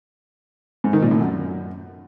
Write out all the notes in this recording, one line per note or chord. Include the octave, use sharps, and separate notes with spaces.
G#2
D#3
A#2
A2
F#2